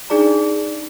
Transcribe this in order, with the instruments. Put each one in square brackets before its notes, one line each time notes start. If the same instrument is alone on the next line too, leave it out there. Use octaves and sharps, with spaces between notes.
[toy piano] D4 D#4 G#4 D5 A#5